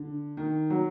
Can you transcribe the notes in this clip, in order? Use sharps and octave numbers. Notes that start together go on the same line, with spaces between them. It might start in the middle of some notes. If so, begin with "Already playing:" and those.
Already playing: D3
D#3
F#3